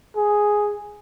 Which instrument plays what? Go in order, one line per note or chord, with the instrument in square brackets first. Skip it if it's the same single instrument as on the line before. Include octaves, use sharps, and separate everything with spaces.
[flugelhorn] G#4